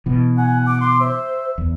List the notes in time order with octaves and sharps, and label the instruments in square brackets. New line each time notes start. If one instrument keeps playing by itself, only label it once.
[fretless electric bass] B2 E3
[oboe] F#5 [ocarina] G#5
[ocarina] D6
[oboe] C6 [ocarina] D6
[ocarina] C5 [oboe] E5
[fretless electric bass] E2